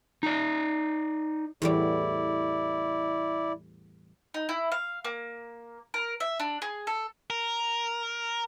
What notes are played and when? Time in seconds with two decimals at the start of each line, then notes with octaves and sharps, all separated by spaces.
0.23 D#4 D5
1.62 E2 A2 G3 E4 D5
4.34 D#4
4.49 E4
4.72 F5
5.05 A#3
5.94 A#4
6.20 E5
6.40 D4
6.62 G#4
6.87 A4
7.30 A#4